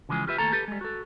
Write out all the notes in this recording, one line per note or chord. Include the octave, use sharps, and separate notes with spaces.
C#3 E3 F3 G#3 G#4
F4 G4 B4 E5
D#2 A#2 A3 A4 A#5
G4 A4 B4
G3 G#3
F#4 A4